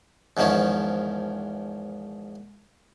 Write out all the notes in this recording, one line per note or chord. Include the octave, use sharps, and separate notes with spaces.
E2 G#2 D#3 F3 C#4